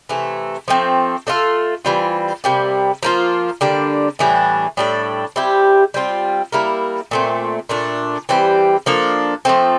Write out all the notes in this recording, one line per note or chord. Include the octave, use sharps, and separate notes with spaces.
C3 E3 A3
F3 A3 C4
A3 D4 F4 A4
E3 G3 C4 F4
C3 G3 A#3
F3 A#3 F4
D3 G3 A#3 D4
A2 E3 G3 D4
A2 G3 D4 A4
G3 C4 E4 G4
G3 C4 F4
G3 A#3 E4 A#4
A#2 A3 C4
A#2 A3 D4
E3 G3 C4 G4
F3 A#3 D4 A4
F3 A3 C4